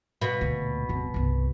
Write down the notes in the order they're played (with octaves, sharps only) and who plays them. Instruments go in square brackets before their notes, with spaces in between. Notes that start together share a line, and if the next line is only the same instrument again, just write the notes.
[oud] B2
[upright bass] D2 A#2
D1 G2
G1 C2